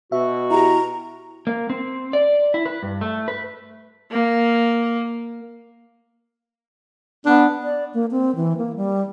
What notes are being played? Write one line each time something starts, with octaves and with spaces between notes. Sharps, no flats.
B2 F#4 E5
E4 G4 A#5
A#3
C4
D5
E4
B4
G2
A3
B4
A#3
B3 D4
D5
A#3
C4
E3
A#3
G3